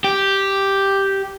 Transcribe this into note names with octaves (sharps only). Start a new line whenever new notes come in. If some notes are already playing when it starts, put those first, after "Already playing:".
G4